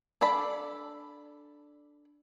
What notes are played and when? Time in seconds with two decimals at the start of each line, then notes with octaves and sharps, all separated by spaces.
0.21 D4 A4 D5 B5